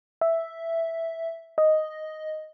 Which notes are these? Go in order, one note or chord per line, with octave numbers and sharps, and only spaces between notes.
E5
D#5